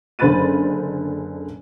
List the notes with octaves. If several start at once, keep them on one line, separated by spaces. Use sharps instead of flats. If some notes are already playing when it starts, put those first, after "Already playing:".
F#1 D3 C5 B5 A6 D#7